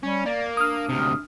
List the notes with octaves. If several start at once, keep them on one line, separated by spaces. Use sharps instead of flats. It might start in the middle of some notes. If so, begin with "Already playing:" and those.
G3 C#4
A#3 D5
D4 D#6 F6
D2 C3